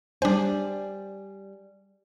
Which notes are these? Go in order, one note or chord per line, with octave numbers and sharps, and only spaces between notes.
G3 D4 C5 D5 G#5